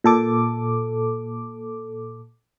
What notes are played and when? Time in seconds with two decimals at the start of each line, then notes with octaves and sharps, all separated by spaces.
0.04 A#2 A4 D6